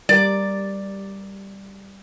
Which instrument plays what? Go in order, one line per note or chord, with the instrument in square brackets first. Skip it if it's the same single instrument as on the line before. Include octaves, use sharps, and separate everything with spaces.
[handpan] G3 A#4 [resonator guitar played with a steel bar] D5